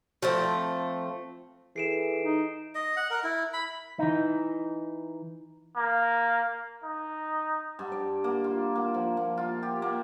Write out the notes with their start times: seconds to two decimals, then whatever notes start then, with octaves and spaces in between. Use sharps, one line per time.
0.22 F3 A3 C4
1.76 E3 G#4 A4 B6 C7 D7 E7
2.23 D#4
2.75 D#5
2.97 F#5
3.10 A#4
3.24 E4
3.53 B5
3.99 E3 D#4
5.76 A#3
6.84 D#4
7.79 G2
7.92 D5
8.24 A#3
8.44 F4
8.75 A#3
8.94 F3
9.17 A#3
9.38 F4
9.63 G4
9.82 A#3